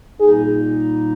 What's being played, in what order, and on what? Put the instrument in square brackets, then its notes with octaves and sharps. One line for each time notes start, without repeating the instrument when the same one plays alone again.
[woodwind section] A#2 G3 A#3 D#4 [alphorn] G#4